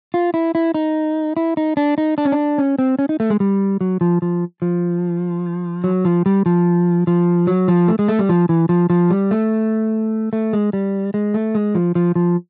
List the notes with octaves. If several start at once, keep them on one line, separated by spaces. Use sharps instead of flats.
F4
E4
E4
D#4
E4
D#4
D4
D#4
D4
C#4
D4
C#4
C4
C#4
D#4
A3
G#3
G3
F#3
F3
F3
F3
F#3
F3
G3
F3
F3
F#3
F3
A3
G#3
A3
G3
F3
E3
F3
F3
G3
A3
A3
G#3
G3
G#3
A3
G#3
F3
F3
F3